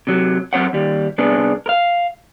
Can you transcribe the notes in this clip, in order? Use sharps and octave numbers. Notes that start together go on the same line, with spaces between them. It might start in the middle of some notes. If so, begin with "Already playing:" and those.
C3 F#3
F#2 C4 C#5 F#5
D#2 G3
C2 B3 D4 G#4
A#4 F5